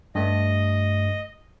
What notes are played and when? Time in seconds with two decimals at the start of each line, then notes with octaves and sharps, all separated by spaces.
0.15 G2 A3 D#5